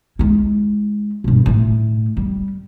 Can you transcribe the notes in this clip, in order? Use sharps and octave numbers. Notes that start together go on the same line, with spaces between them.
G#3 E4
G2 B2
A2 A3
G3